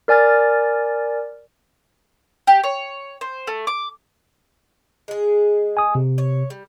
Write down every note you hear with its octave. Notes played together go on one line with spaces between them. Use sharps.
A#4 D5 G#5 F6 A6
G4
C#5
C5
A3
D6
G#3 G#4
G#5 D#6
C3
C#5
G3